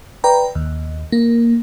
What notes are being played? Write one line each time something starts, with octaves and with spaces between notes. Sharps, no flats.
B4 D5 G5 A#5
D#2
A#3